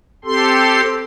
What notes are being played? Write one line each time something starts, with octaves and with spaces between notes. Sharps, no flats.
C4 G4 A4 C6